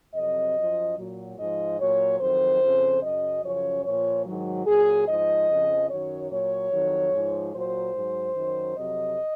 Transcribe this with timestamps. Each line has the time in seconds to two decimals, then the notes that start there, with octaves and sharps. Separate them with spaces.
0.15 F2 C3 F#3 D#5
0.56 F#2 F3
0.98 A#2 F#3
1.38 G#2 F3 D#5
1.80 A#2 F#3 C#5
2.20 F2 D#3 F#3 C5
2.61 F2 C#3 F3
3.03 F#2 C#3 F#3 D#5
3.44 F#2 C#3 F3 C#5
3.84 A#2 F3 C#5
4.25 G#2 D#3 F#3
4.67 A#2 F#3 G#4
5.08 G#2 F3 D#5
5.49 F2 C#3 F3
5.89 F#2 D#3 F#3 C#5
6.31 A#2 F#3 C#5
6.72 F2 D#3 F#3
7.13 G#2 F3
7.54 A#2 F#3 C5
7.95 G#2 F#3
8.36 F#2 D#3 F#3
8.77 F2 C3 F#3 D#5